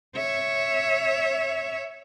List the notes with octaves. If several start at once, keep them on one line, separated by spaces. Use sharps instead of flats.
C#5 E5